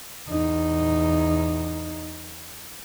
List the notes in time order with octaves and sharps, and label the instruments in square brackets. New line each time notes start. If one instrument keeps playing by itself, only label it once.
[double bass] E2 D#4